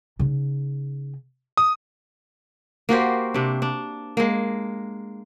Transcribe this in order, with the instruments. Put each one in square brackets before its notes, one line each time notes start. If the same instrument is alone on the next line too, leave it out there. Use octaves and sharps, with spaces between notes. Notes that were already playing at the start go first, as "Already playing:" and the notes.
[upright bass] C#3 D#4
[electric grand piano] D#6
[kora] A#3 F#4 G4 C5
C3 D4
D4
G#3 A#3